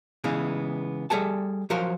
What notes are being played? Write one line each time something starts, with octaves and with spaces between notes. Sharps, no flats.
C#3 E3 G#3 B3
G3 G#4 A4 F#5 A5
F3 F#3 F#4 A#4 C5